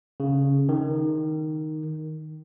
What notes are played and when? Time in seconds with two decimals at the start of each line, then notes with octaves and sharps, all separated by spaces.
0.20 C#3
0.69 D#3